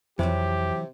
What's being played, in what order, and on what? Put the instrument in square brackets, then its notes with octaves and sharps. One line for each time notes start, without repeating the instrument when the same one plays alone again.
[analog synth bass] F2 [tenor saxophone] C3 [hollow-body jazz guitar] E3 F#3 [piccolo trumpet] G4